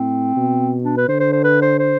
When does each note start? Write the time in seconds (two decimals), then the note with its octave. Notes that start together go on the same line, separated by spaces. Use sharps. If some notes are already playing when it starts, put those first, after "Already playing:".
Already playing: A2 C4
0.36 B2
0.84 D4
0.97 B4
1.08 D3 C5
1.20 C5
1.33 C5
1.44 B4
1.62 C5
1.79 C5